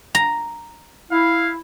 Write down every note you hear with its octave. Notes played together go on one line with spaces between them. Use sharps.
A#5
E4 F5